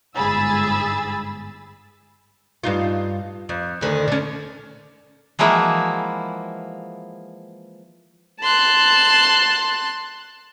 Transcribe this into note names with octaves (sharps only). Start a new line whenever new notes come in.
G1 G#2 G#4 B5 E6 A6
G2 D#4 F4
F2
D2 D3 D#3
D3 C#4
E3 F3 G#3 A#3 E4 F#4
A5 C6 F#6